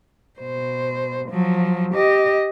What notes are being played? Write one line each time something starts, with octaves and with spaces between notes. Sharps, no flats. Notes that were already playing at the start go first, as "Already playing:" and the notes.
B2 C5
F3 F#3
G4 D#5